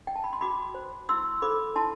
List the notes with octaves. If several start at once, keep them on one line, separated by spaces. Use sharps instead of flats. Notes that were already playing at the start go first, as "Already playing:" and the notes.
G5
A5
B5
C6
F#4 B5 D6
C5
E4 C6 E6
A4 C5 B5 D6
E4 A5 C6